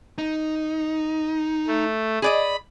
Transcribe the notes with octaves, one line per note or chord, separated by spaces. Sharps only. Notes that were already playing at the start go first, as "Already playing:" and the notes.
D#4
A3
G#4 D5 D#5 B5